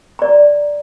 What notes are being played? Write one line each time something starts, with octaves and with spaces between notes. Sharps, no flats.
D5 A#5